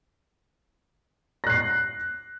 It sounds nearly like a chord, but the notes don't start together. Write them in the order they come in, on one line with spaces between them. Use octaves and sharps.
A#6 F#6 C7